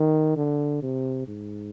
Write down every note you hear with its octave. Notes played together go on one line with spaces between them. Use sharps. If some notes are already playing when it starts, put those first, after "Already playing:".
Already playing: D#3
D3
C3
G#2